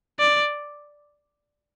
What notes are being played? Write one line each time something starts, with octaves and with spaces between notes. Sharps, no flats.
D5